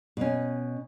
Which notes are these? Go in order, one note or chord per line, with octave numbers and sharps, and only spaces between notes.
B2 C#4